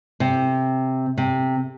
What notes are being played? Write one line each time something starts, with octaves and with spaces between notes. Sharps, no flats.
C3
C3